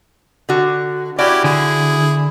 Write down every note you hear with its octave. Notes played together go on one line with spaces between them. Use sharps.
D3 F#4
C#4 E4 F#4 G4 D5
D3 E4 G#4